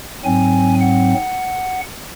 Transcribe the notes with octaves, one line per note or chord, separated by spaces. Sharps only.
G#2 F#3 C4 G#5
F#5